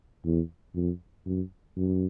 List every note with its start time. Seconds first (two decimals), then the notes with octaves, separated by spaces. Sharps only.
0.25 E2
0.75 F2
1.26 F#2
1.77 F#2